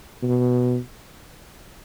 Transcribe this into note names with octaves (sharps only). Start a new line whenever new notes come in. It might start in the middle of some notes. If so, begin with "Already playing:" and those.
B2